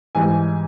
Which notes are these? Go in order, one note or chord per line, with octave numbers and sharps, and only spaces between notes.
G#2 E3 G3 G#5